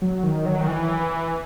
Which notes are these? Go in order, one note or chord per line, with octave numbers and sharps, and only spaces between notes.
F#3
D#3
F#3
D#3
E3